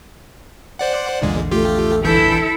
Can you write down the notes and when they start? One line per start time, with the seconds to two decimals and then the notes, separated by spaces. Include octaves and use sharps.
0.79 C5 D5 F#5
1.22 A#1 E2 A#2 D3 G#3
1.51 A3 F4 G4
2.04 G1 E3 E4 A4 A5 G6